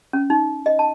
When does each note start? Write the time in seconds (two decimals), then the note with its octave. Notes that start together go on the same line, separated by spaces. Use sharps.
0.13 C#4
0.30 D#4
0.66 D#5
0.79 A5